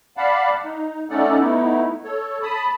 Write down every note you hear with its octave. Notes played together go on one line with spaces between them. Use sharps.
D5 F5 F#5 A5 B5
D#4
A3 C#4 D#4 A4 D5 F#5
A3 B3 D#4 E4
A4 C#5
A5 B5 D#6